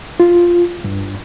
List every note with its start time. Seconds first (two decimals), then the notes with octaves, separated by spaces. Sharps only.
0.20 F4
0.84 G2